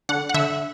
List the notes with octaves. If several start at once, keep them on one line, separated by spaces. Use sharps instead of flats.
D3 F#5
F#5
D3 E5